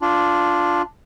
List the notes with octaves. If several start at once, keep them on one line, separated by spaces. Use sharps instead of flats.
D4 F4